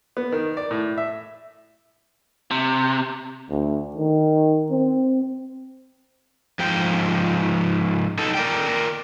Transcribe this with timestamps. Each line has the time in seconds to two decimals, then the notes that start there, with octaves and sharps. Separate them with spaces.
0.17 B3
0.32 D#3
0.57 D5
0.71 A2
0.98 E5
2.51 C3
3.50 D2
3.96 D#3
4.71 C4
6.59 G#2 F3 G5
8.19 D#4 A4
8.34 A#4 D5 G5